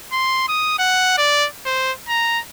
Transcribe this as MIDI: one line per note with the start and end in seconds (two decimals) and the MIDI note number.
0.12 0.45 84
0.48 0.74 87
0.78 1.14 78
1.17 1.46 74
1.65 1.92 72
2.08 2.39 82